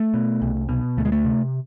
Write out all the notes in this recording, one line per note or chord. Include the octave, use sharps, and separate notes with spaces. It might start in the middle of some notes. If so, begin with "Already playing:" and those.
Already playing: A3
B2
C2
B2
D2 A3
G#3
A3
C3